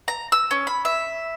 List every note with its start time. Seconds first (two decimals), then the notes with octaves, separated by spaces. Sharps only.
0.08 A#5
0.32 E6
0.51 C#4
0.67 B5
0.85 E5